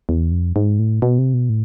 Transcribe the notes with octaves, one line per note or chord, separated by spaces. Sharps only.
E2
F2
G#2
A2
B2
C3
B2
A2